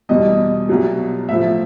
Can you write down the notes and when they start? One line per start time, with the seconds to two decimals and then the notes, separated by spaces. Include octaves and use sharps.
0.09 E2 B2 G3 D#5
0.69 C2 B2 F#3
1.29 A2 F3 E5